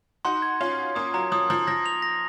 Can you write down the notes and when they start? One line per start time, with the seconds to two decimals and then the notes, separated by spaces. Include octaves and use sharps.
0.25 D#4 F#4 C6
0.42 G#6
0.61 C#4 F4 C6
0.79 G#6
0.95 A#3 C#4 D#6
1.14 F#3 A#5
1.32 F3 D#6
1.50 F3 A#5
1.67 F3 A#6
1.86 F7
2.02 A#6